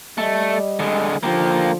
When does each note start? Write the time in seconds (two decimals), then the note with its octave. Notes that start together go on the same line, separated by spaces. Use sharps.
0.18 G3 A3 D5 D#5
0.80 D3 G#3
1.23 D3 F3 A#3 G4